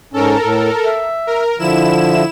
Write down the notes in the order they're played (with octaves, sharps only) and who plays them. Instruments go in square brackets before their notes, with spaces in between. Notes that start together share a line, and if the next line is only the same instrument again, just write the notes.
[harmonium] G#2 C#4 [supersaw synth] A4 A#4
[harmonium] A2
E5
[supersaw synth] A#4
[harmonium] D3 F3 [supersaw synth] E4 E7